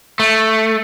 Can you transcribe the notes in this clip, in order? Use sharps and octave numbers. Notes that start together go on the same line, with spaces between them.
A3